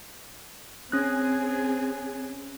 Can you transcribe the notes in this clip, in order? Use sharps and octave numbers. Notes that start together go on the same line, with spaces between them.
C4 C#4 G#4 F#6